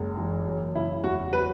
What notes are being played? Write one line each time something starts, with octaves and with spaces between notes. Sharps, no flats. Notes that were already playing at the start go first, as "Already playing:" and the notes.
Already playing: F#1 G#3
E3
F#2
C#3 E4
E2 F#4
F#3 B4